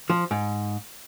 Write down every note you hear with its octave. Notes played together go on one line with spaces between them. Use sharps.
F3
G#2